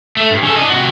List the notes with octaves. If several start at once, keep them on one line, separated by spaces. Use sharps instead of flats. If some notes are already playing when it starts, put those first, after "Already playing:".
A3
G2
C#3 A4
D4 D#5
C3 F#4